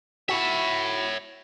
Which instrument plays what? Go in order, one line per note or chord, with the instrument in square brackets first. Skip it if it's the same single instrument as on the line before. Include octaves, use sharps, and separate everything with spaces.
[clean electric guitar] E4 F#4 [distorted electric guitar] C#5 E5